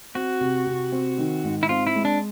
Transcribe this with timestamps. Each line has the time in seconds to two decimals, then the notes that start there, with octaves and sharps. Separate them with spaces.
0.15 C4 F#4
0.41 C3
0.66 C3
0.92 C4
1.18 D#3
1.44 G#2
1.63 E4
1.69 C4 F4
1.87 E4
1.96 G#3
2.05 D4